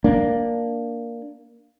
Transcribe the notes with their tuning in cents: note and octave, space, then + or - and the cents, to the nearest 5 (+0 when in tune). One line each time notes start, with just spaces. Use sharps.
A#3 +0 D4 +0